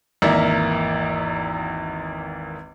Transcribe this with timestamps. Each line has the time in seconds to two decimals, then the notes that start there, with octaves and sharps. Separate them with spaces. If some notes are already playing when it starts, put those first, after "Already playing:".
0.22 G#1 E2 A#3 D5 E5 A#5